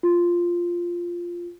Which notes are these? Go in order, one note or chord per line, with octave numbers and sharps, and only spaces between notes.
F4